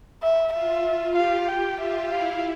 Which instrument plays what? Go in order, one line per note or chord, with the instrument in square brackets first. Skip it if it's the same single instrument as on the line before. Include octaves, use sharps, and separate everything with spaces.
[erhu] E5
[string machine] F4 [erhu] E5
[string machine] F4
[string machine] G4 [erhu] F5
[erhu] G5
[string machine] F4 [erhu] E5
[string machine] E4 [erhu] F5